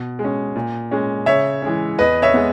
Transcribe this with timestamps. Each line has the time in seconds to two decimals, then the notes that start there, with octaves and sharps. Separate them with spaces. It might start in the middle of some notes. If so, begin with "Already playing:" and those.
Already playing: B2
0.19 G#3
0.24 C#4
0.56 A#2
0.91 G#3 C#4
1.26 C#3 C#5 E5
1.62 E3 G#3 C#4
1.99 E2 B4 D#5
2.22 C#5 E5
2.34 G#3 B3